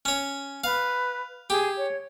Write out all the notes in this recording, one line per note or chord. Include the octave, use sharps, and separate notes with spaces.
C#4 C#5
B4 F5
G4 G#4
C#5